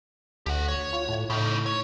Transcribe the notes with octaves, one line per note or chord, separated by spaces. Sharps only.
D2 G4 F#5
C#5
F4
A2
A2 C#3 D#4
C#5